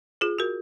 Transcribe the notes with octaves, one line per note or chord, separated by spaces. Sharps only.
F4 G#4
F#4 A#4